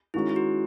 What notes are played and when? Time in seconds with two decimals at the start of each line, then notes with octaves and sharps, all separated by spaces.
0.14 D#3 G#3 C#4 E4 F#4
0.29 E4
0.36 F#4